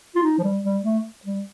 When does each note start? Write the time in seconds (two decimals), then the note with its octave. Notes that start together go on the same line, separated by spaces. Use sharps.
0.15 F4
0.23 D#4
0.38 F3
0.43 G3
0.63 G3
0.84 A3
1.25 G3